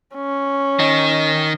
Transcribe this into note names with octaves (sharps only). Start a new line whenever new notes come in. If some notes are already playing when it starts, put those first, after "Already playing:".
C#4
D#3 D#4